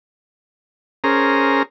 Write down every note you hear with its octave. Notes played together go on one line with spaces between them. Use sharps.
C#4 G#4 A#4 C5 A#5